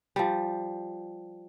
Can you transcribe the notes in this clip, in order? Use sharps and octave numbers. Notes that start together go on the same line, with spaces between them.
F3 G3